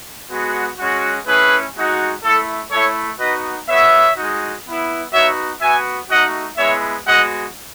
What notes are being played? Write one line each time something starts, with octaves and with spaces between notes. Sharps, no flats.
G#3 B3 F#4
G#3 C#4 F#4
A3 C#4 E4 G#4 B4
G#3 D#4 F#4
A3 E4 A4
A3 E4 A4 C#5
B3 D#4 F#4 B4 D#5
B3 F#4 C#5 E5
G#3 D#4 F#4
B3 E4
B3 D#4 F#4 C#5 E5
B3 F#4 E5 G#5
A3 D#4 F#4 D#5 F#5
G#3 B3 E4 C#5 E5
G#3 B3 F#4 D#5 F#5